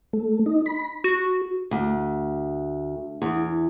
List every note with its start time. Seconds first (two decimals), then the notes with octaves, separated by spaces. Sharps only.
0.13 A3
0.46 D#4
0.66 B5
1.04 F#4
1.71 D2
3.22 E2